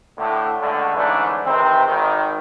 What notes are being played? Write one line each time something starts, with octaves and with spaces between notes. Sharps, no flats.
A2 D3
C#2 D3 A3
G#2 D3 E3 A3 C#4 D4
C3 D#3 E3 C4
G#1 D#3